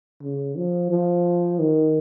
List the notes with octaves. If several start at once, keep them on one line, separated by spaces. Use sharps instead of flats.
C#3
F3
F3
D#3